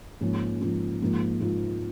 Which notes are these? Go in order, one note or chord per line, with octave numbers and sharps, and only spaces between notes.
G#2 F3 A#3 C#4 F4
G#2 F3 A#3 C#4 F4
G#2 F3 A#3 F4
G#2 F3 A#3 F4